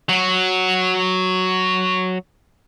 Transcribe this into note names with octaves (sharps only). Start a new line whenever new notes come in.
F#3 F#4